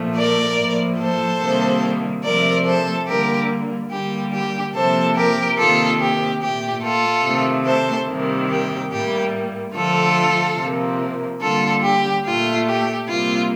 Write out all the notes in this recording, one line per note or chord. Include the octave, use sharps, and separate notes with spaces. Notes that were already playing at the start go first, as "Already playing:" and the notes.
Already playing: A#2 F3 A3
A#4 D5
A2 F3 A#3
A4 C5
C3 D#3 G3 A#3
C3 F3 A3 A#4 D5
A4 C5
D3 G3 A#3 G4 A#4
D3 G3 A#3 G4
G4
C3 F3 A#3 A4 C5
G4 A#4
C3 D#3 A#3 F4 A4
G4
A#2 A3 G4
F4 A4
C3 D#3 A3
A4 C5
C3 D#3 G3 A#3
G4
A2 G3 A#3 G4
D3 F3 A3 F4 A4
C3 F3 A#3
D3 G3 A#3 F4 A4
G4
A#2 A3 F4
G4
C3 G3 A#3 F4